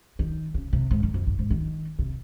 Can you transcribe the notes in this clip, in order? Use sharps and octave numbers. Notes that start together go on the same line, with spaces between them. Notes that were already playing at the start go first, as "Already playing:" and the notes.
D#3
C#3
C3
G#2
G2
F2
G2
G#2
D#3
C3